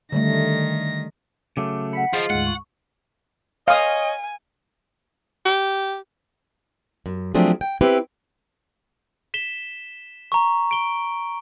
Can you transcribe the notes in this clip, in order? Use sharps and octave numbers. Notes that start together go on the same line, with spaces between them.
D3 D#3 G3 A3 A#6
C#3 F#3 A3 D6
F#5 B5 B6 C#7
F3 F4 G#4 D#5 C7
D2 G#2 F#5
C#6
C#5 D#5 F5 G#5 D#6
G4
F#2
F3 F#3 A3 C4 D4 G#4
G5
C4 E4 G4 B4
B6 E7 G7
A#5 C#6
D7 G7